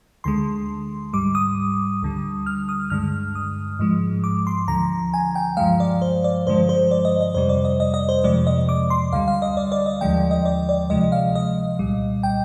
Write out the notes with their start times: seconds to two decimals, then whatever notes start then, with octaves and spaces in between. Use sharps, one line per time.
0.24 D2 D3 G#3 C6
1.13 G#2 G3 D6
1.35 D#6
2.02 D2 D3 G3
2.46 F6
2.69 D#6
2.90 G2 D3 G#3 F6
3.35 D#6
3.79 G#2 F3 G#3
4.24 D6
4.47 C6
4.68 D2 D3 F3 A#5
5.14 G#5
5.35 G5
5.57 G2 F3 G#3 F5
5.80 D5
6.02 C5
6.24 D5
6.47 G2 D3 F3 G#3 C5
6.69 C5
6.91 D5
7.05 D#5
7.21 D#5
7.34 F2 C3 G3 C5
7.49 D5
7.65 D#5
7.80 D#5
7.94 D#5
8.09 C5
8.24 F2 C3 F3 G#3 D5
8.47 D#5
8.69 D6
8.90 C6
9.12 D2 D3 G3 F5
9.28 F5
9.42 D#5
9.57 D5
9.72 D5
9.86 D#5
10.01 D#2 D3 F3 G#3 G5
10.31 D#5
10.45 D5
10.69 D5
10.90 D2 C3 F3 G#3 D#5
11.12 F5
11.35 D#5
11.79 C2 A#2 G3
12.23 G5